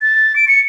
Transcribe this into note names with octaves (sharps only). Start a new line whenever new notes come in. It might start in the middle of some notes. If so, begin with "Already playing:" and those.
A6
D7
C#7